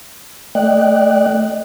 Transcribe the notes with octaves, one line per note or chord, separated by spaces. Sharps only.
A3 D5 D#5 G5 F#6